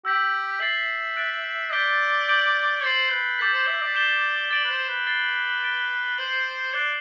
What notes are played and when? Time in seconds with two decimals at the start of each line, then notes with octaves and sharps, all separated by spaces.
0.05 G4 E6 G6 B6 F#7
0.60 E5 A6 C7 F#7
1.16 F#6 A6 D7
1.72 D5 G6 B6 D7 G7
2.28 G6 D7 F#7
2.84 C5 A6 C7 F#7
3.12 B4
3.39 A4 D6 G6 B6
3.54 C5
3.67 E5
3.82 D5
3.95 G6 C7 E7 G7
4.51 D5 A6 D7 F#7
4.64 B4
4.70 C5
4.88 B4
5.07 A6 C7 G7
5.63 A6 D7 G7
6.18 C5 G6 C7 F#7
6.74 D5 F#6 C7 E7 G7